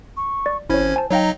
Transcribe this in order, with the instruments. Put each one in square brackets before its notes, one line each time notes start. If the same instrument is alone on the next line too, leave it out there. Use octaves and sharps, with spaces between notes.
[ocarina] C#6
[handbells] D5
[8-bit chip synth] G#1 C#4 G#6 [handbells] E4 C#5 [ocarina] C5
[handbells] G#5 A5
[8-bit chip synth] F#3 D#4 D#5 [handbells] C#5 F5 G5 [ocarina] A#5